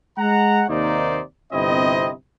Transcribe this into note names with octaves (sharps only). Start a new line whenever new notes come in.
G#3 F#5 A#5
D#2 C3 A#3 D#4 C5 D5
G1 C3 C4 E4 D#5